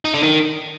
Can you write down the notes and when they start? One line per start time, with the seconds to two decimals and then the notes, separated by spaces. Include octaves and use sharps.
0.05 D#4
0.14 D3
0.23 D#3